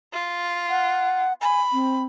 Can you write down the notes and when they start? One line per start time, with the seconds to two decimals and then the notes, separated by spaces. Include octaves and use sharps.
0.13 F4
0.70 F#5
1.41 G#5 B5
1.73 C4